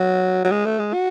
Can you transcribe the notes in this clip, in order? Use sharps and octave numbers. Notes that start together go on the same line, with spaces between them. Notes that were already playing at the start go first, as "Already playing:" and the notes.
Already playing: F#3
F#3
G#3
A3
G#3
F#4